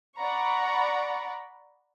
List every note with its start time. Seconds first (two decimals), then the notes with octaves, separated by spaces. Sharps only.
0.17 D5 F#5 A#5 B5 C#6